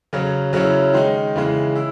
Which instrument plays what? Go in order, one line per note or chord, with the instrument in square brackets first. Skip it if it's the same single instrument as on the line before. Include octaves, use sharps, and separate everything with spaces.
[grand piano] C#3 F#3 C#4
C#3 F#3 C#4 E4
D#3 G#3 D#4
C#3 E3 G#3
E4